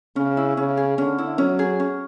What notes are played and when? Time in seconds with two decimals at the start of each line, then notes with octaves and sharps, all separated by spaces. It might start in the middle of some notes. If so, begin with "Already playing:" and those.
0.16 C#3 C#4
0.37 E4
0.57 C#3 C#4
0.77 G#4
0.98 D3 C#4
1.18 E4
1.38 F#3 C#4
1.59 G#4
1.80 C#4